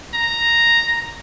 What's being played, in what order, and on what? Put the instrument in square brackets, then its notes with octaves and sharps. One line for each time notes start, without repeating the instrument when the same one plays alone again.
[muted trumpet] A#5